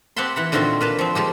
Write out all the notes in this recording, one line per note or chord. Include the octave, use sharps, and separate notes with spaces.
C4 G4 F#5 A5 B5 C6
E3 F#5 B5
A#2 D3 D#3 C4 F4 F#4
A#3 B4 A5
F3 C4
F3 G#3 G4